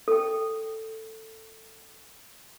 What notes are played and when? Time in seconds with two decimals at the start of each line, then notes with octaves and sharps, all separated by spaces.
0.08 A4 G5